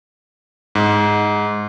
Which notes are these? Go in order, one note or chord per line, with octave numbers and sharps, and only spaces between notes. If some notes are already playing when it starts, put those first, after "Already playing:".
G#2